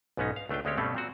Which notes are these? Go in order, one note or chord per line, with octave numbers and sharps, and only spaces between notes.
B1 G#2 B3 C#4 D#4
F5
C#2 A3 D4 F4 G5
D2 G#3 C4 C#4 G4 C#5
G2 B2 G3 A3 C4 C#4
A#2 C4 F#4